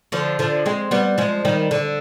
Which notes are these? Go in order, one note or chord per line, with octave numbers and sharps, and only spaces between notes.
D3 F3
D3 F3
G#3 C4
G3 B3
F3 G#3
D#3 G3
D3